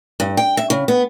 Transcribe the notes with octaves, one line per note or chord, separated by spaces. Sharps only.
G2
G5
E5
C#3
B3